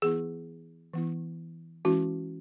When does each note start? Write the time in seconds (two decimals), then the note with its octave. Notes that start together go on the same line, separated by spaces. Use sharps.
0.02 E3 B3 E4 G#4
0.93 E3 B3 E4
1.85 E3 G#3 C#4 E4 F#4